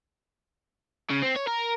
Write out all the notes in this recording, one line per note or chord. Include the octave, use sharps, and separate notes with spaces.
C#3
C4
C#5
A#4